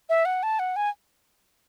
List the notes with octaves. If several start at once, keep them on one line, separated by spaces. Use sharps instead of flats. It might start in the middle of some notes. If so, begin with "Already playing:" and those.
E5
F#5
A5
F#5
G#5